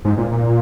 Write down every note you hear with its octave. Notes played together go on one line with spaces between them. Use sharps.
G#2
A#2
A#2